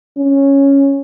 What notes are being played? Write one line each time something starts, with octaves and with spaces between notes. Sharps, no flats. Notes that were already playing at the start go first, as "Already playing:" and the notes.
C#4